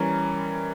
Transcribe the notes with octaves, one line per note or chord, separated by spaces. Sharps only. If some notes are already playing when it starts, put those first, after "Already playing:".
Already playing: E3 G3 C#4 A#4